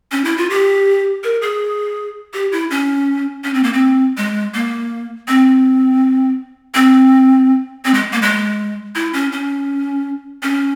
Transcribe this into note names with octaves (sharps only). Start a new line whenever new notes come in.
C#4
E4
F4
G4
A#4
G#4
G4
E4
C#4
C#4
C4
A#3
C4
G#3
A#3
C4
C4
C4
G#3
A#3
G#3
E4
C#4
C#4
C#4